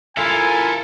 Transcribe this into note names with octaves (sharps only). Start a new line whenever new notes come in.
E4 F4 A4 A#4 E5 G#5